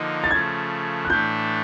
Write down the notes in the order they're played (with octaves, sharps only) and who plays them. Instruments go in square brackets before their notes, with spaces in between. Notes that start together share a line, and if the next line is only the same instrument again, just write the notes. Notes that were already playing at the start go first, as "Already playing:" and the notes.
Already playing: [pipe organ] D3 F3 A#3 D#4
[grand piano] A6
[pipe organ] C#3 F3 A3 [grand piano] G#6
[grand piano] F#6
[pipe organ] A2 E3 A3 D4 [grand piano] G6